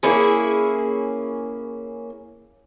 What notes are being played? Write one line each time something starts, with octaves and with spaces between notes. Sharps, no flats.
A#3 C#4 E4 G#4